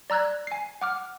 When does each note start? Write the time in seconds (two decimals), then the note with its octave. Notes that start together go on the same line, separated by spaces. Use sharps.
0.10 D5 A#5 E6 F#6 G#6
0.47 G#5 C7
0.81 F#5 D6 F6